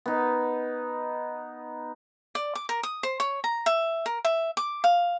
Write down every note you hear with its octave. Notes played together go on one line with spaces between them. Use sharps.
B3 D#4
D5
D6
A#4
D#6
C5
C#5
A#5
E5
A#4
E5
D6
F5